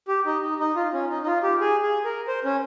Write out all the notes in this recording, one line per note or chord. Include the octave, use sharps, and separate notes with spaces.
G4
D#4
D#4
D#4
F4
C#4
D#4
D#4
F4
G4
G#4
G#4
A#4
C5
C#4